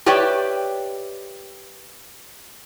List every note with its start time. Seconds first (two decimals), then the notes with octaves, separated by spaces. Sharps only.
0.06 G4 B4 C#5 D5 E5 G5